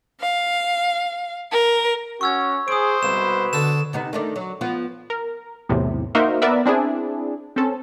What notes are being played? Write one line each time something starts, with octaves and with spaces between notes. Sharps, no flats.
F5
A#4
C#4 F#4 C#6 E6 G#6
G#4 C5 D#6 D7
C2 B2 B4 E7
D3 A4 E7
C3 B3 D#4
D#3 A3 D4
F#3
F3 B3 F4
A#4
B1 E2 A2 C3
A#3 D#4 F#4 A#4 C5 E5
B3 A#4 B4 D5 E5
C4 D4 E4 G#4
C4 C#4 A4